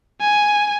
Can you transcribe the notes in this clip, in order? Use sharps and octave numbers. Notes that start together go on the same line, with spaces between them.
G#5